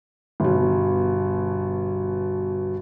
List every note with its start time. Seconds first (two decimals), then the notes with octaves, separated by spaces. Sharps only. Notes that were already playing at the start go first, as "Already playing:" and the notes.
0.40 G1 B2